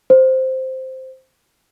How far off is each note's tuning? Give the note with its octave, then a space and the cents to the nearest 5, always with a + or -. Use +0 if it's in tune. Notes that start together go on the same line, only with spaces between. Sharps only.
C5 -5